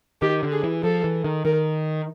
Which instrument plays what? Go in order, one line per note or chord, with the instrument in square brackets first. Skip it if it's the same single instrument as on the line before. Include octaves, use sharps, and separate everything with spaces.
[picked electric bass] D#3 [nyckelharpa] G4
[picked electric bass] D3
[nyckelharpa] G#4
[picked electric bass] E3
[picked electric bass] F3 [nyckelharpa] A4
[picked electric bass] E3
D#3
[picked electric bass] D#3 [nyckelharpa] A#4